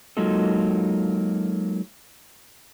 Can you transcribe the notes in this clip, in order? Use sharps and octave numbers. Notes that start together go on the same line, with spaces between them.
F#3 G#3 A#3 D#4 F4 A4